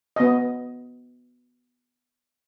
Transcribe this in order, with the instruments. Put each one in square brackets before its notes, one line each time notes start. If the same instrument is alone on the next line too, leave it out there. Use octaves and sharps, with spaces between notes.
[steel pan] B3 D#5